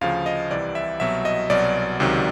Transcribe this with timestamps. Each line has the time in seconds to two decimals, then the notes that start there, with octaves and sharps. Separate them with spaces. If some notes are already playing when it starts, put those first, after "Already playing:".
0.01 D2 C#3 F3 F5
0.26 D#5
0.51 C2 C3 E3 D5
0.75 E5
1.00 C2 B2 F#3 E5
1.25 D#5
1.50 C2 B2 F#3 D5
2.00 C#2 C3 D#3 F#3